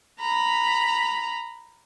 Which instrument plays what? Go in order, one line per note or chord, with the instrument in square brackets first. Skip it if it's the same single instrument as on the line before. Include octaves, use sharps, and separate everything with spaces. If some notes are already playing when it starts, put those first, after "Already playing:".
[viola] A#5 B5